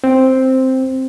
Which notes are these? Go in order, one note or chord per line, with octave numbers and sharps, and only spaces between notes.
C4